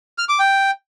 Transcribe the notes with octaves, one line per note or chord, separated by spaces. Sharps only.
F6
D6
G5